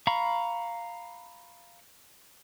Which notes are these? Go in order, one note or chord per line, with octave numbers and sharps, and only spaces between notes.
F5 A#5 B5 C#6